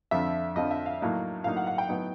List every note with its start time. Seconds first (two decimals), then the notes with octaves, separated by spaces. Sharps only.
0.11 F2 D3 F3 E5
0.56 F2 D3 F3 D#5
0.71 E5
0.86 F5
1.01 A2 F#3 A#3 D#4
1.44 A2 F#3 A#3 D#4 F5
1.57 F#5
1.67 F#5
1.78 G5
1.89 A2 F#3 B3 D#4